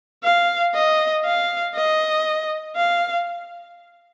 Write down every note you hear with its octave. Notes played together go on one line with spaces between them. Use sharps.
F5
D#5
F5
D#5
F5